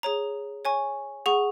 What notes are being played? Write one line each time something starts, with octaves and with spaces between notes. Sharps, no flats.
G#4 C#5 A#5
C#5 G#5 C#6
G#4 F#5 C#6